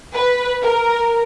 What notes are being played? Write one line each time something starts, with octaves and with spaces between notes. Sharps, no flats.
B4
A#4